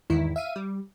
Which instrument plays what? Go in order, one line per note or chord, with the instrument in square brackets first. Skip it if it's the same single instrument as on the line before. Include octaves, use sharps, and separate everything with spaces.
[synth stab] E2 G#2 D#3 E4
E5 F5 D#7
G3